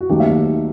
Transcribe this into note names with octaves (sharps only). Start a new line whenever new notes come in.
F#4
D#2 D#3 F#3 A3 D#4 G4
E5